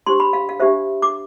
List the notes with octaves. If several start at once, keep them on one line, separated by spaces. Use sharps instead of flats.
D4 G4 C5 C6
B5
F5
F5
D4 G4 C5 E5
D6